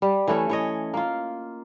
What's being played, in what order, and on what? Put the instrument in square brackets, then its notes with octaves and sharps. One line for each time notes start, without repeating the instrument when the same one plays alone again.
[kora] G3
E3 A3 C#4
E3 C#5 D#5
A#3 F4